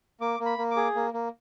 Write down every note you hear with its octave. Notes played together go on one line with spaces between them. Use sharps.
A#3 D6
A#3
B5
A#3
D6
G#4
A#3
A#3